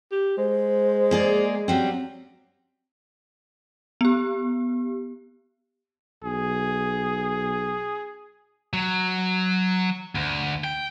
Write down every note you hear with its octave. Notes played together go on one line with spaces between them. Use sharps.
G4
G#3 C5
A#3 G#4 D5
F#3 G3 C4 C#4
B3 G4
B1 G#4
F#3
D2
G5